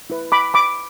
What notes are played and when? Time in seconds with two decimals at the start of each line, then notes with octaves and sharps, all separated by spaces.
0.10 E4 B4
0.32 B5 D6
0.54 B5 D6